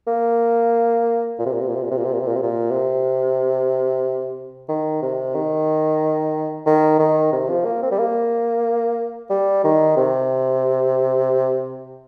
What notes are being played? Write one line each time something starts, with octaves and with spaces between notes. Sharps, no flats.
A#3
A#2
C3
A#2
C3
A#2
C3
A#2
C3
A#2
C3
A#2
C3
A#2
C3
A#2
C3
D#3
C3
D#3
D#3
D#3
C3
F3
A#3
C4
G3
A#3
G3
D#3
C3